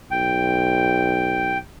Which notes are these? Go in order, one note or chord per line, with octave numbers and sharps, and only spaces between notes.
B1 G5